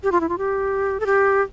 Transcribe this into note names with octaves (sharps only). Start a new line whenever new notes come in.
G4
F4
E4
F4
G4
A4
G4